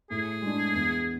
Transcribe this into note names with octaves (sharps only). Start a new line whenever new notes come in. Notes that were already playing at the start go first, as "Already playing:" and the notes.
A2 G#4
G#3 D4
E2